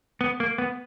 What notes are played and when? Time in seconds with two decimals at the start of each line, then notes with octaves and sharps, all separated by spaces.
0.21 B3
0.40 A#3
0.58 B3